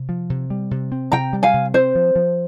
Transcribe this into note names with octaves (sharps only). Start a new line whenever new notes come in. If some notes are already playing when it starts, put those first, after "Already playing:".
Already playing: C3
F3
C3
G3
C3
C4
C3 G5 A#5
G3
F5 G#5
C3
C4 C5
F3
F3